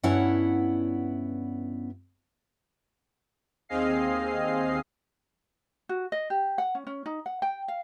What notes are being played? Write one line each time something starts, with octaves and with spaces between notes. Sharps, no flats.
G2 B3 C#4 E4 F#5
D#2 C4 G#4 D#5 F5 C7
F#4
D#5
G4
F#5
C#4
C#4
D#4
F#5
G5
F5